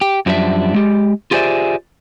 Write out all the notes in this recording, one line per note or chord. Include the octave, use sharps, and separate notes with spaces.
G4
F#2 F3 G3 D4 E5
G#3 G4
F4 G4 G#4 C5 D5 E5